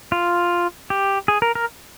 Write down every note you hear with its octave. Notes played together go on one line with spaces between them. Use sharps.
F4
G4
G#4
A#4
A#4